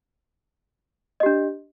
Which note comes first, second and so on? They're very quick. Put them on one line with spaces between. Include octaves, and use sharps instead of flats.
D#5 G4 D4